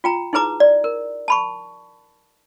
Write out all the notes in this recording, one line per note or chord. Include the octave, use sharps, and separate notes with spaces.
F4 G5 A#5
D#4 E4 G#4 B4 A#5 D6
D5
A#4
A5 B5 C#6